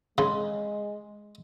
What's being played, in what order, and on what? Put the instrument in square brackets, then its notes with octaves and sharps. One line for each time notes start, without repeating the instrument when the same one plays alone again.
[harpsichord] C#3 [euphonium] G#3 [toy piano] C6